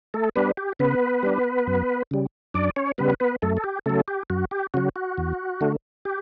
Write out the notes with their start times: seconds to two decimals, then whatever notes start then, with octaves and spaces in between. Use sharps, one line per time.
0.14 A3 A4
0.36 G3 B3 D4 B4
0.57 G4
0.79 C#3 B3 B4
1.23 G3 D4
1.67 F#2
2.11 C#3 G3
2.54 F#2 D4 D5
2.76 C#4 C#5
2.98 C#3 G3 B3 B4
3.20 B3 B4
3.42 F#2 A3 A4
3.57 A4
3.64 G4
3.86 C#3 F#3 A3 A4
4.08 G4
4.30 F#2 F#4
4.51 G4
4.74 C#3 F#3 F#4
4.96 F#4
5.18 E2
5.61 D3 A3
6.05 G4